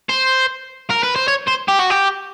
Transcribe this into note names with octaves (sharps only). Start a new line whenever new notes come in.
C5
A#4
B4
C5
C#5
C5
G4
F#4
G4